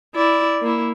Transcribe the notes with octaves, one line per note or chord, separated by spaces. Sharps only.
E4 D5
A#3 E4